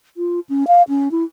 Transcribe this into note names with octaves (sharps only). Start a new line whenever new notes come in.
F4
C#4
F5
C#4
E4